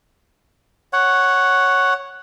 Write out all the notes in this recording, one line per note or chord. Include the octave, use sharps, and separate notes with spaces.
C#5 F#5